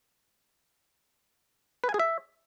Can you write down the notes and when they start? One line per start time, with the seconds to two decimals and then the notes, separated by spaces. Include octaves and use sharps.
1.84 B4
1.89 G#5
1.94 G#4
2.00 E5